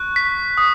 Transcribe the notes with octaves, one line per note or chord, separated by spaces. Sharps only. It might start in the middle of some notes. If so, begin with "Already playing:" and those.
Already playing: C#6 F#6
B6
D#6